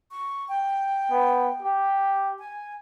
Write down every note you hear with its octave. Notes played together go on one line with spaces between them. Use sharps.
C#6
G5
B3
G4
G#5